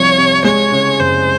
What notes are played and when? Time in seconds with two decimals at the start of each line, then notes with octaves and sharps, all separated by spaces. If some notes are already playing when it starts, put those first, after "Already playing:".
Already playing: C2 F3 C4 C#5
0.18 C3
0.44 G#3 C#5
0.72 C#3
0.99 F#1 C5